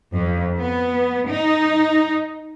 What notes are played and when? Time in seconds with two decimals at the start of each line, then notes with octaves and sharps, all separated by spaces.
0.14 F2
0.58 B3
1.29 D#4